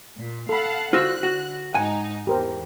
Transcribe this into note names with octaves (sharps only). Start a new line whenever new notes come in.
A#2
A4 F5 F#5 A5 B5
D3 F4 F#4 C5 E6 F#6
F#4
G#2 D#4 F#5 G#5
E2 G4 A#4 C5